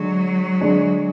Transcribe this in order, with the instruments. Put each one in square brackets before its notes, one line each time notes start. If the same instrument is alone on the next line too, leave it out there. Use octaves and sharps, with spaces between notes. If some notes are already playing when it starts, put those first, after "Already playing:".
Already playing: [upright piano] D3 G#3 D4 [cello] F#3
[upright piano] D3 G#3 D4 G#4